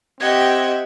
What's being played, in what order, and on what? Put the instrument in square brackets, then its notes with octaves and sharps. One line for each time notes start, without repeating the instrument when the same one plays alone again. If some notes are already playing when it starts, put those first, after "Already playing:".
[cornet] C4 [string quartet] G4 E5 G5 [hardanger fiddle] D#5 F#5 [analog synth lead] G#6